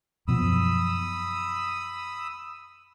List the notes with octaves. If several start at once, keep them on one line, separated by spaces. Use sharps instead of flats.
F#2 B2 F3 B5 D#6 E6